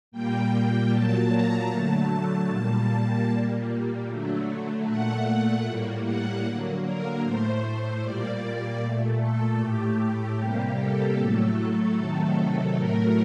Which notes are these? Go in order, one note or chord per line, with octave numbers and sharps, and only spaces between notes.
A#2 G3 A#3 G5
A#2 F#3 A#3 A5
A#5
D3 F#3 A3 A5
A#2 G3 A#3
A#2 G3 A#3
D3 F#3 A3
A#2 A3 F#5
A2 G3 A#3
F#5
D3 F#3 A#3
A#4
A2 A3 C5
C5
A#2 G3 A#3 D5
A#2 A3
A4
A2 A3 G4
C3 G3 A#3 G4
A4
A2 F#3 A3
C3 D#3 F#3 A3
A2 F#3 A3 A#4